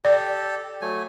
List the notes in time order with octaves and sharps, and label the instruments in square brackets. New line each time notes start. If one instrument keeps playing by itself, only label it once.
[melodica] G4 A4 [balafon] D5
[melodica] F#3 A3 G#5